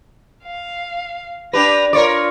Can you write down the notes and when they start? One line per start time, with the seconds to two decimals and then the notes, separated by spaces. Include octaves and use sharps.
0.44 F5
1.53 D4 G4 B4 A#6 F7
1.93 F4 A#4 C#5 D5